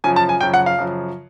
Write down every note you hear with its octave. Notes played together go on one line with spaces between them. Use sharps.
F#2 C#3 F3 G#5
A5
G#5
F#2 C#3 F3 G5
F#5
F5
F#2 C#3 F3